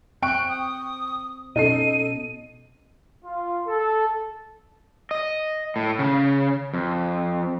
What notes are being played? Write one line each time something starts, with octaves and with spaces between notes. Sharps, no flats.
C4 G5 C#6 F#6 D7
D#6
B2 C#4 D#4 A4 C7 D#7
F4
A4
D#5
A2
C#3
F2